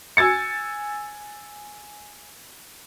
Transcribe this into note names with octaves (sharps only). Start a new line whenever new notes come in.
G#5 E6 G#6 A6 C#7